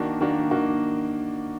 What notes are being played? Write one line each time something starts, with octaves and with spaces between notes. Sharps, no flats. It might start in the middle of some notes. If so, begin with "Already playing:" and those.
Already playing: D#3 A#3 D4 F#4
D#3 A#3 D4 F#4
D#3 A#3 D4 F#4